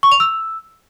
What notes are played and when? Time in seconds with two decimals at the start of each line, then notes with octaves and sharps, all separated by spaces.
0.03 C#6
0.12 F7
0.20 E6